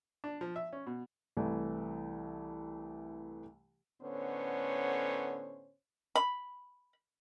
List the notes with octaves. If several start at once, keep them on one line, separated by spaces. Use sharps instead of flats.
D4
F3
E5
C#4
B2
C2 E3 A3
A2 D3 B3 C#4 C5 C#5
B5